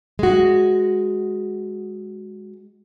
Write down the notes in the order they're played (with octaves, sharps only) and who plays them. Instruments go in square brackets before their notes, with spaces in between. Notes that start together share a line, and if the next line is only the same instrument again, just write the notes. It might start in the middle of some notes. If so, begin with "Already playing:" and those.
[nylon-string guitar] G#3 F#4